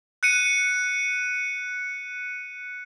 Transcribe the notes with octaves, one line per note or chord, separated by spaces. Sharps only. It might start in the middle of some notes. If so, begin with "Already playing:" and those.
F#6 C#7 D#7